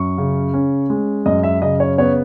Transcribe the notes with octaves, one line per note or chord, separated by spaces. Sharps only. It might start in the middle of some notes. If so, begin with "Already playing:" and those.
Already playing: F#2 C#6
C#3
C#4
G#3
F#2 D#5
E5
C#3 D#5
C#5
B3 C#5